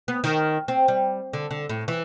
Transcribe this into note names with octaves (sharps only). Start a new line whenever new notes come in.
B3
D#3
C4
G3
D3
D3
A2
E3